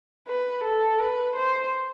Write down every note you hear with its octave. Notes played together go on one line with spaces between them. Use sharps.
B4
A4
B4
C5